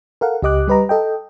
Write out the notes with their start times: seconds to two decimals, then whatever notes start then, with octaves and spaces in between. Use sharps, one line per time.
0.21 A4 A#4 F5 F#5
0.43 C#2 G4 D#5 D6 F#6
0.68 G3 G4 B4 D#5 A#5
0.89 A4 D#5 G5